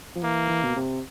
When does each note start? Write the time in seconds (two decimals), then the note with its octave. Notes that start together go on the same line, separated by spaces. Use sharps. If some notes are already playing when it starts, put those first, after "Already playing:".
0.15 F3
0.23 E3 A#3
0.49 E3
0.64 B2
0.76 C3